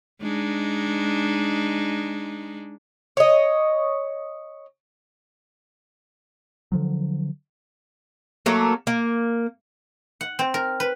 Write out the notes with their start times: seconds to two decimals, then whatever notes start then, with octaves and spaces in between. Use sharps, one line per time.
0.22 G#3 D4 D#4
3.17 C#5 D#5
6.72 D3 F3 F#3
8.46 F#3 A3 A#3
8.87 A#3
10.21 F#5
10.39 C4
10.54 A#4
10.80 B4